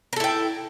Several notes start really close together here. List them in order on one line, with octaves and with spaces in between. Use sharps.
A#4 A4 E4 G5